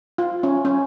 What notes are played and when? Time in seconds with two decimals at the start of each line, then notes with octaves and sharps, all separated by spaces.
0.18 F4
0.43 C#4
0.65 C#4